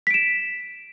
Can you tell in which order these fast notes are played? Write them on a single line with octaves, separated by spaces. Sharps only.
B6 D7 E7